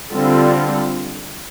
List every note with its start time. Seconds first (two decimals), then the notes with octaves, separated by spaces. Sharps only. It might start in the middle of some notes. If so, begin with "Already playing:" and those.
0.11 D3 G3 C4 F4 A4